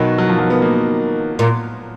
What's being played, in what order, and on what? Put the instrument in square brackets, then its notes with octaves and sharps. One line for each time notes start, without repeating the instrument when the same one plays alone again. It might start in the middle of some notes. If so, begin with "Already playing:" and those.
Already playing: [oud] B2 D#3 [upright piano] F#3
[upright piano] F#3
F3
F#3
B3
A#3
[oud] A#2